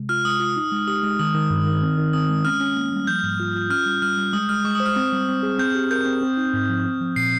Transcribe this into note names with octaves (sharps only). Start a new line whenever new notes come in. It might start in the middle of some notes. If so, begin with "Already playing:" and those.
Already playing: C3 G#3
F4 F6
G#3 D#6
F4
D#4
G#3
G4 D#6
G#3
D#3 D#6
D#3
G2
D#3
C4
D#3
C4 D#6
G#3
C#4 F6
C#4
A#3
G3
F3 G6
G#2
F4
F4
C#4 F6
G3
G3 F6
G3
G#3 D#6
G#3 F6
G#3 C#6
C5 D#6
F6
C4
G3
C4
G#4
C4 G6
G4
A#4 G6
C4
C4
D#4
G#2
F3
C4
F3
A#2 C7